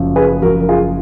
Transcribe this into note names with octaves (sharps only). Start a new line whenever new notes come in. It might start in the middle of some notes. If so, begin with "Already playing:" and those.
Already playing: F#1 F#2 F3
G#4 B4
F#1 F#2 F3 F#4 A#4
A#4
F4 G#4